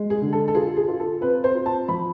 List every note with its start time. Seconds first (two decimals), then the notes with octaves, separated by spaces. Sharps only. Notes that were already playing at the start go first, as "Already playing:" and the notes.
Already playing: G#3
0.10 G#4
0.21 D3
0.33 A4
0.48 A4
0.55 F4 G#4
0.77 G#4
0.88 F4
1.00 A4
1.21 C4 B4
1.44 C5
1.55 F4
1.66 A5
1.88 F3 B5